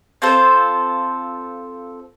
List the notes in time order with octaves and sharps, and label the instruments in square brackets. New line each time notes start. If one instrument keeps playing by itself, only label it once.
[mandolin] C4 F4 A4 C5